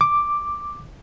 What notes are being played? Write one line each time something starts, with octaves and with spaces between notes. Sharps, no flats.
D6